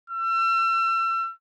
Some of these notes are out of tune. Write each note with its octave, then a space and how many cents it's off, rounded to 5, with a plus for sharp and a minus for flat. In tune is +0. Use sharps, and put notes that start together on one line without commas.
E6 +35